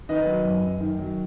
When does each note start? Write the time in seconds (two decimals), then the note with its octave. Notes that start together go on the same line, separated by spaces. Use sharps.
0.09 D#3 B4 D#5
0.27 F#3
0.45 F#2
0.62 F#2
0.80 D#3
0.99 F#3